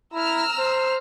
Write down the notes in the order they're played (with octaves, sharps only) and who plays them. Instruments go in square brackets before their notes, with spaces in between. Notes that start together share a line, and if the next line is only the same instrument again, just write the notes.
[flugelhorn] E4 [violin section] A#5 E6 F6
[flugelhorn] C5